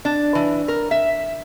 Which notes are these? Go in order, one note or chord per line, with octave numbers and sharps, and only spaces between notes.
D4
E3
A#4
E5